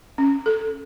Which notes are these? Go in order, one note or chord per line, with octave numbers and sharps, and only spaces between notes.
C#4
A4